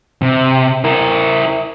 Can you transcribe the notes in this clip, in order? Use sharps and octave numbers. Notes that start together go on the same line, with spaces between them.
C3
E4 A#4